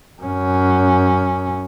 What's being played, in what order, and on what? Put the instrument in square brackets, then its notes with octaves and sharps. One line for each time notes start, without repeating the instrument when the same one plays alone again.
[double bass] F#2 C#4